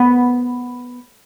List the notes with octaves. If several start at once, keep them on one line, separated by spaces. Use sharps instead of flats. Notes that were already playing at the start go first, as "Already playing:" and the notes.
Already playing: B3